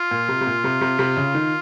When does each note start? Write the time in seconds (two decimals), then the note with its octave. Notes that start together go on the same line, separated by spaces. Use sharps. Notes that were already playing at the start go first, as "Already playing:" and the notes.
Already playing: F4
0.11 A#2
0.28 C3
0.41 C3
0.47 A#2
0.64 C3
0.81 C3
0.99 C3
1.17 C#3
1.35 D#3